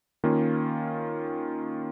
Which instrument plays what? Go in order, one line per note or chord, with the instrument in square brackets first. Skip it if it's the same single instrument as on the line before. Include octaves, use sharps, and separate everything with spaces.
[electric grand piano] D#3 A#3 C#4 F4